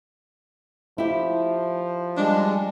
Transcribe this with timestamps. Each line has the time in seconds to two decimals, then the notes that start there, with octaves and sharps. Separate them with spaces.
0.98 F3 E4 G4
2.17 G3 G#3 D4